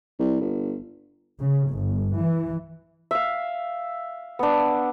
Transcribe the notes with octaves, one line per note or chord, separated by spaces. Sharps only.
C2
G1
C#3
G1
E3
E5 F5
B3 D4